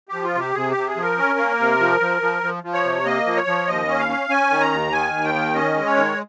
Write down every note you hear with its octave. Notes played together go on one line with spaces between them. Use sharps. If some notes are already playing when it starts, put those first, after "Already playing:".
F3 G4
F4
C3 G4
C3 G#4
G4
C3
G#4
F3
A#4
C#4
A#3
C3
F3
F3
F3
F3
F3
C#5
C3
A#3 D#5
F3
C#5
F3
D#2 D#5
C#4
F5
C#4
C#4 G#5
D#3
A#5
D#2
D#3 G#5
D#2
G5
D#3
C#4 D#5
G#3
C#5
D#3